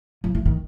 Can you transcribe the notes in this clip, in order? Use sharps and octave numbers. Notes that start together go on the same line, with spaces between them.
F3
E3
D#3